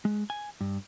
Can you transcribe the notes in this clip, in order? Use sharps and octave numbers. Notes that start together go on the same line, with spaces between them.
G#3
G#5
G2